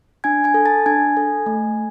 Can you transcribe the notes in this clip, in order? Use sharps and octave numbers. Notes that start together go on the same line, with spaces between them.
D4 G#5 G#6
G#5 G#6
A4
A5 A6
D4 G#5 G#6
A4
A3